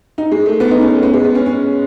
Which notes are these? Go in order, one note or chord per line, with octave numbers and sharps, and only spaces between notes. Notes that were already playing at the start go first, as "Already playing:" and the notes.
D#4
G#3
A3
B3
D#4
C#4
A3
B3
G#3
B3
C#4
C#4